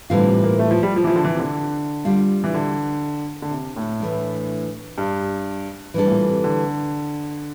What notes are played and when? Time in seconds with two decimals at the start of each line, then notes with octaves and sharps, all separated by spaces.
0.10 A2 D3 E3 G3 C4 F4
0.27 C3
0.44 A#3
0.59 A3
0.71 F3
0.83 G3
0.96 F3
1.04 E3
1.07 F3
1.16 D3
1.24 E3
1.35 C3
1.40 D3
2.05 G3 D4 F4
2.44 E3
2.54 D3
3.42 D3
3.51 C3
3.76 A2
4.00 E3 A3 D4
4.98 G2
5.94 E3 G3 D4 A4
6.06 A2
6.11 A#2
6.28 C3
6.44 D3